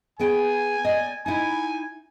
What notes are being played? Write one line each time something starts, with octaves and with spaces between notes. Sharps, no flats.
B3 G#4 G5 G#5
D5 D#5
D#4 E4 G#5